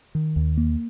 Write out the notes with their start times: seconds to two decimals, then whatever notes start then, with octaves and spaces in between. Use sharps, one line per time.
0.15 D#3
0.36 D#2
0.57 A#3